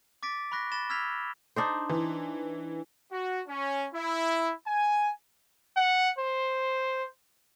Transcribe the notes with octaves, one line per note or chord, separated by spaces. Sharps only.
D6 A6 B6 D7
B5 C#6 F#6 A#6 B6
B5 A6 E7 G7
E6 F6 G#6 B6 C7 F7
D4 D#4 C5
E3
F#4
C#4
E4
G#5
F#5
C5